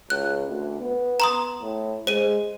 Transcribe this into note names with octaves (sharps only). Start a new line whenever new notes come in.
C#2 F#6
D2
B3
A#5 C6 D#6
A2
G#3 C5 D#7